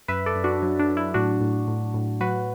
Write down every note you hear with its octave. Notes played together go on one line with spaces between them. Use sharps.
F#2 B4 E5
A4 D5
F#2
D4 F#4
F#3
D4
F#3
E4
A2 D4 F#4
A2
A2
A2
F#3 F#4 B4